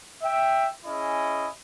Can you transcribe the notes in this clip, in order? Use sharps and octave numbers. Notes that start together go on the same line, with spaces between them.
E5 G5
C#4 E4 G#4 D#5